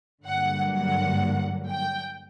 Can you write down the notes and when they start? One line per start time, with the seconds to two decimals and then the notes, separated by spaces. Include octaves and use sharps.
0.25 G2 D3 F#3 A#3 F#5
0.73 F#5
1.68 G5